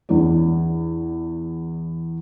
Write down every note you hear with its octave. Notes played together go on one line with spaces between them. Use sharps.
E2 D4